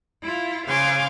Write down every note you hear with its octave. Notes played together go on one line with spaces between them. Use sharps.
E4 F4
C#3 C5 F5 G#5 C6 D6